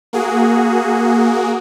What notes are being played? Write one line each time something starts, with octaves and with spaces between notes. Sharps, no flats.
A#3 F#4 G#4